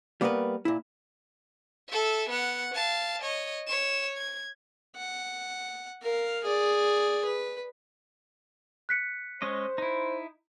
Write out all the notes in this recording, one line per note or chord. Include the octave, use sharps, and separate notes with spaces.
G3 A#3 B3 G#4 A#4 B4
A#2 E4
A4 E5
B3 F#5
F5 A5
C#5 D#5
C#5 E7
G#6
F#5
A#4 F5
G#4 D5
B4
F#6 B6 C#7
G#3 C#4 C5 D#5
D#4 E4